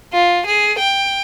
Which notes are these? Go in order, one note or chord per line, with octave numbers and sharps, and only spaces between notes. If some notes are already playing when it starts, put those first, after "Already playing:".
F4
G#4
G5